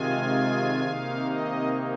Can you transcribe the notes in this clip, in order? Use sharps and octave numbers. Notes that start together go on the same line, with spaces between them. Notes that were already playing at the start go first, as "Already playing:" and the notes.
Already playing: C3 D#3 G#3 F4 G#5
C3 D#3 A#3 D#4 F5
D#5